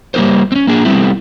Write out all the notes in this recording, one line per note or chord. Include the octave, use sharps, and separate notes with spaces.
G3 A#3 D#4 A#4 C5
C4 C#4
A#3 D4 G#4
G3 A3 B3 C4 E4